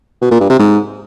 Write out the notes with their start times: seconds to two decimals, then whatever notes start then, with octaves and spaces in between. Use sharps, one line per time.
0.22 B2
0.31 A#2
0.40 G2
0.50 C3
0.59 G#2